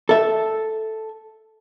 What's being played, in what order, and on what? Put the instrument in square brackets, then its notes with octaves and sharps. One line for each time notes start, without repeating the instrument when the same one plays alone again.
[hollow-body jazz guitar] A4 E5